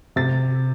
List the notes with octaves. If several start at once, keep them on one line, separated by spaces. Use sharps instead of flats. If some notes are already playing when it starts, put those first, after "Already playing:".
C3 A6